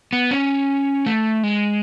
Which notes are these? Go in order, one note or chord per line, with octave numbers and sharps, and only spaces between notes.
B3
C#4
A3
G#3